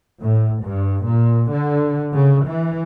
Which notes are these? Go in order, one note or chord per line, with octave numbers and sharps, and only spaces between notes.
A2
G2
A#2
D3
C#3
E3